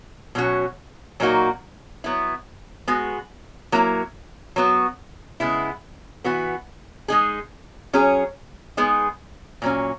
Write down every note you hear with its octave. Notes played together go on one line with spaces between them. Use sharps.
B2 F#3 C#4 F#4
A#2 F#3 A#3 D#4 F#4
F#3 B3 E4
G#3 B3 F#4
F#3 A#3 E4
F#3 B3 F#4
C#3 G#3 B3 E4
E3 B3 F#4
G#3 D#4 G#4
F#3 C#4 G#4
G#3 B3 D#4 G#4
A#2 F#3 C#4